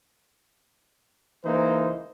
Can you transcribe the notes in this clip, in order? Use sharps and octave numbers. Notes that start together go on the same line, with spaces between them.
C#2 E3 A#3 D#4 C5